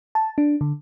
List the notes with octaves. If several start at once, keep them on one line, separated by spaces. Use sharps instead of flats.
A5
D4
D3